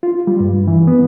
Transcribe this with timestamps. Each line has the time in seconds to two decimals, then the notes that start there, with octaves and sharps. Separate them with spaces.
0.03 F4
0.27 G3
0.40 G2
0.68 E3
0.87 B3